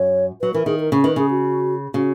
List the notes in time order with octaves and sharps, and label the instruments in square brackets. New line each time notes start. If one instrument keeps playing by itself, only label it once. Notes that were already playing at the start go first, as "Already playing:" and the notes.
Already playing: [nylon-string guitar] F#2 [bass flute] C#5
[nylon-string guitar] F#3 [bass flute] B4
[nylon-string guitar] E3 [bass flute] A#4
[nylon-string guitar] D#3 [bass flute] G#4
[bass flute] A#4
[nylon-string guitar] C#3
[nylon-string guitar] D#3 [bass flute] B4
[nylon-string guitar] C#3 [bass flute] G#4
[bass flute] F#4
[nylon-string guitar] C#3 [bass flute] F#4